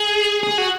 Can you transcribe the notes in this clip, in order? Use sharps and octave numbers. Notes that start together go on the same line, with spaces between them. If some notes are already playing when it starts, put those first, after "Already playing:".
Already playing: G#4
G#4
F#4